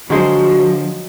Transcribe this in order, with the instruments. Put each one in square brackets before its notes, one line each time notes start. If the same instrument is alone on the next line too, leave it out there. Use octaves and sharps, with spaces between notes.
[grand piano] D3 [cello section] F3 [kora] F#3 G#3 C5 [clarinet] F#4